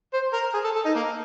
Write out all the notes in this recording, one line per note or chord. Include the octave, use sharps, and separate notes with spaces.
C5
A#4
G#4
A4
A4
D#4
A#3